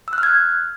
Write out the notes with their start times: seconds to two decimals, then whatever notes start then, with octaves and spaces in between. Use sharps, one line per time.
0.08 E6
0.13 F#6
0.18 F6
0.23 G#6